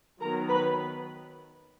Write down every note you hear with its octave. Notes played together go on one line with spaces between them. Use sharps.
D#3 F#3 B3 A#4 A#5
B4 B5